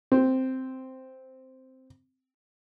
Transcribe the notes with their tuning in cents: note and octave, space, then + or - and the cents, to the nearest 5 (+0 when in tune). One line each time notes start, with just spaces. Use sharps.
C4 -5